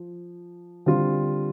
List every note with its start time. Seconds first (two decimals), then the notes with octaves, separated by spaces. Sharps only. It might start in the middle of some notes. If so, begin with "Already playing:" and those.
Already playing: F3
0.86 D3 G3 C4 F4